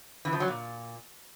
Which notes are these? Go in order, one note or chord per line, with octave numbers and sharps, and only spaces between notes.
E3
F3
F#3
A#2